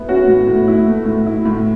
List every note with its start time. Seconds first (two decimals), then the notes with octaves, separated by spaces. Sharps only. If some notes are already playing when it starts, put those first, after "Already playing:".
Already playing: A3 B3 E4
0.08 C#4 F#4
0.27 A2
0.47 A2
0.68 E4
0.86 A3
1.06 A2
1.26 E4
1.45 A2